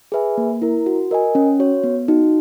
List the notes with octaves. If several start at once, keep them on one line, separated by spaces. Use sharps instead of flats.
G#4 B4 E5 G#5
A#3
E4 A#4
F#4
A#4 D#5 G#5
C#4
F#4 C#5
B3
D#4 F#4